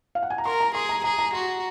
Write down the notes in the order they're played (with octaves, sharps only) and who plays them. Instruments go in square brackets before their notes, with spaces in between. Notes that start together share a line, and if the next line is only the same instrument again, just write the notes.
[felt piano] F5
F#5
G#5
A#5
[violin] A#4 [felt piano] C6
[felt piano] A#5
[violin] G#4 [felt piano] C6
[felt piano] A#5
[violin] G#4 [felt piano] A#5
[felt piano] A#5
[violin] F#4 [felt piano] C6